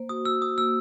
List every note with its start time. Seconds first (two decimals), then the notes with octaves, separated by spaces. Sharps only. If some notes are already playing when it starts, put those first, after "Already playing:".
Already playing: A#3 C5
0.09 F#4 D#6
0.25 F#4 E6
0.41 F#4 D#6
0.57 A#3 E6